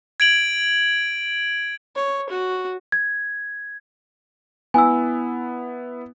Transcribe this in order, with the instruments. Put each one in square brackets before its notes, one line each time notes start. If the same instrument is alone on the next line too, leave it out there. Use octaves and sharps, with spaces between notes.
[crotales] G#6 D7 F#7
[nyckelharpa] C#5
F#4
[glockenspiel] G#6
[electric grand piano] B3 E4 [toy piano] G#5 E6